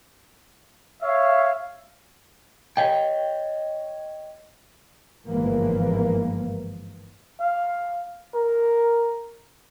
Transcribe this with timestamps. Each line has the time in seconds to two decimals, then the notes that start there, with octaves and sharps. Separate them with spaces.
1.02 C#5 E5 F5
2.77 C#5 D#5 G5
5.26 G1 G#2 E3 F3 A#3
7.40 F5
8.34 A#4